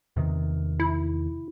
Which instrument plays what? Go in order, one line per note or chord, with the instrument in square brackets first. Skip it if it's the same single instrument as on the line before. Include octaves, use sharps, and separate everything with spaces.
[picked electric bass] E2 C3 D#3
[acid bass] E4